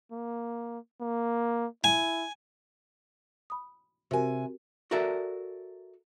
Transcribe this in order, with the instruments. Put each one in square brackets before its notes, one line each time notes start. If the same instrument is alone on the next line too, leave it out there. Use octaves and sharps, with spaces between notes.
[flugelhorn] A#3
A#3
[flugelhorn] E4 [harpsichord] G#5
[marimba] B5 D#6
[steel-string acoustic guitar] C3 G#5 [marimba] F#4 G4 A#4
[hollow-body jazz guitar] F#4 A4 A#4 D5 E5